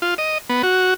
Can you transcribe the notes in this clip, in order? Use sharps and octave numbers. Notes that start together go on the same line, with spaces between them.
F4
D#5
B3
F#4